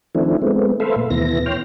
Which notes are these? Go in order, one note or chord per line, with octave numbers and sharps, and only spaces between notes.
D#3 F3 A3 C4 D4 E4
G#3 A3 B3 C4
A3 A4 B4 C5 E5 F5
A#2
D#2 B2 E3 B3 E4 A#6
C#5 G5 C6 F6